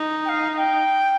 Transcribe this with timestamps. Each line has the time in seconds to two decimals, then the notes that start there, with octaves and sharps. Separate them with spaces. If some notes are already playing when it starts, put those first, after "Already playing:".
Already playing: D#4
0.25 G5
0.29 F5
0.57 G5